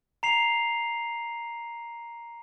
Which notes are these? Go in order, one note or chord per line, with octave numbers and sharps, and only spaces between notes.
A#5 C7 F7